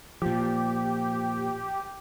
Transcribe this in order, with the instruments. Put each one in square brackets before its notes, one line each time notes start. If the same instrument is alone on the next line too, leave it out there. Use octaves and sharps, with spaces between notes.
[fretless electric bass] A#2 F3 [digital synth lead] G4